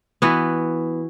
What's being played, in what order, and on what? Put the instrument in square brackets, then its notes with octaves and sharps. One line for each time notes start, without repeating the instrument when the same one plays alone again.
[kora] E3 B3 F#4